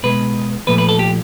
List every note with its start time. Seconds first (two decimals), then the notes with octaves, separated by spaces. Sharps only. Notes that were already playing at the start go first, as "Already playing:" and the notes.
0.03 B2 G#3 B4
0.67 A#2 F3 A3 B4
0.78 B4
0.89 A4
0.99 G4